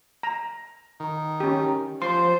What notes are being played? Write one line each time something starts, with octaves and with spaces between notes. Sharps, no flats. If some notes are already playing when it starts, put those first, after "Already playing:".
A#5
D#3
C#4 G4
F3 C5 C6